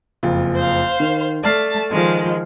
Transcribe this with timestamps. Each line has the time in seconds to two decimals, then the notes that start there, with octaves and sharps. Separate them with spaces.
0.23 F#1 F2 F4
0.57 C5 F5
1.00 D#3
1.43 A3 D5 A5 F6 C7
1.90 D#3 F3 G#3